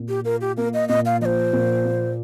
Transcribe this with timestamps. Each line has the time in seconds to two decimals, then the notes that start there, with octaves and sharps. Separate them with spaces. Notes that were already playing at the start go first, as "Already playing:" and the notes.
Already playing: A#2
0.09 G4
0.25 F4 A#4
0.41 G4
0.57 A#3 A#4
0.74 D#5
0.89 A#2 D#5
1.05 F5
1.21 F3 D#5
1.25 C5
1.53 A#2
1.85 A#3